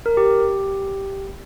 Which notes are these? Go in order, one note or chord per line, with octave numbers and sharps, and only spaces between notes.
A#4
G4